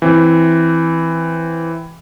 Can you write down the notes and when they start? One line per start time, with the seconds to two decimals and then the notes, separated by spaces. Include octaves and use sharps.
0.02 E3 C4